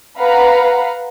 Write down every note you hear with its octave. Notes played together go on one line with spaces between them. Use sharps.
B4 F5 F#5 A#5 B5